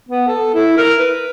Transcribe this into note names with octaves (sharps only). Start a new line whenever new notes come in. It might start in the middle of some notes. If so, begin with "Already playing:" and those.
B3
A4
E4
A#4
B4